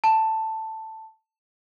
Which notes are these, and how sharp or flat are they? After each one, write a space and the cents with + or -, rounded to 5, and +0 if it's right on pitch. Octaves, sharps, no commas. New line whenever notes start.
A5 +10